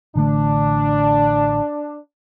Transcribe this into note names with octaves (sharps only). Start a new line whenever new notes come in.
A1 D3 A3 D4